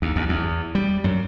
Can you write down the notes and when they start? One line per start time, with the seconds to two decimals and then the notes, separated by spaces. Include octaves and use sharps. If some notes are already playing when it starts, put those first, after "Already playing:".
0.02 D#2
0.16 D#2
0.29 E2
0.75 G3
1.04 F#2